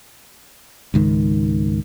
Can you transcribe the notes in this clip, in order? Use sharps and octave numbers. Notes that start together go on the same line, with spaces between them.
C#2 G#2 D#3